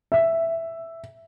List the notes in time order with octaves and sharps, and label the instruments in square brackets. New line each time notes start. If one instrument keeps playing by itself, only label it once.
[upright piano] E5